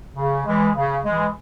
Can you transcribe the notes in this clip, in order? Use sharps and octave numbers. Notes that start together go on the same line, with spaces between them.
C#3
E3 G#3
C#3
E3 G#3